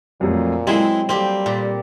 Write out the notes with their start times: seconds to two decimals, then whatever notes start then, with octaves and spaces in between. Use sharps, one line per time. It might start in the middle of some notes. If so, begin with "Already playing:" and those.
0.21 F2 A#2 F#3 A3
0.67 F#3 G#3 C4 E4 G#4
1.09 G3 A#3 C4 G4
1.46 A#2